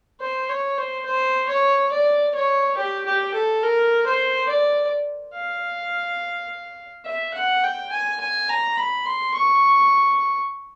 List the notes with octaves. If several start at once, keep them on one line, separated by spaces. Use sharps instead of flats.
C5
C#5
C5
C5
C#5
D5
C#5
G4
G4
A4
A#4
C5
D5
F5
E5
F#5
G5
G#5
G#5
A#5
B5
C6
C#6